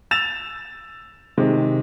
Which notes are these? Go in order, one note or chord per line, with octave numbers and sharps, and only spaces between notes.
E6 A6 E7 F7
C3 D#3 G#3